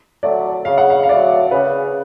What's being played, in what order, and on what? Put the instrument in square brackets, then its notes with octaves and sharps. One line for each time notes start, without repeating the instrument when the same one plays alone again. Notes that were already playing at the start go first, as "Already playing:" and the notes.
[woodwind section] F#3 A3 [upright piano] D5
[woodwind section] C#3 [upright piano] F5
[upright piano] F#5
F5
F5
[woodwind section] F#3 A3 [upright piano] D5
[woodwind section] C#3 [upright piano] B4